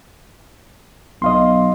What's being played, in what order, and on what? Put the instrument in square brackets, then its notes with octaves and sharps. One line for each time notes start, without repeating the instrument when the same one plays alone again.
[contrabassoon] B1 [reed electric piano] D#5 F5 C6